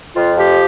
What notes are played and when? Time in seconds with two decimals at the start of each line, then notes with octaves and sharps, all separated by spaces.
0.15 F2 F4
0.37 F3 G4